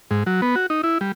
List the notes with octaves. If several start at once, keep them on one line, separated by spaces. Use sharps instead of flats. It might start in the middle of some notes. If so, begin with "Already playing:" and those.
G#2
F#3
B3
F#4
D#4
E4
G3